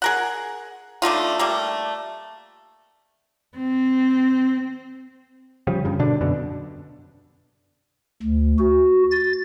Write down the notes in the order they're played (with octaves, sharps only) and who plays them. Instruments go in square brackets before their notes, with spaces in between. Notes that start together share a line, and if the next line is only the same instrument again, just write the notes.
[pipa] G#4 A#4 F#5
D3 A3 D#4 F4
G3 A3 A#3
[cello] C4
[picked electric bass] C#3 F3 G3
G2 C#3
B2 D3 D4
F#2 B2 D3
[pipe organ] D2
F#4
A6